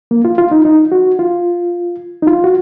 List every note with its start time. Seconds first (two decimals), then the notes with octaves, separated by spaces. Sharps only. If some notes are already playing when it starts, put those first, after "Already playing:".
0.11 A#3
0.25 F4
0.38 F4
0.51 D#4
0.65 D#4
0.92 F#4
1.19 F4
2.22 D#4
2.27 F4
2.44 F#4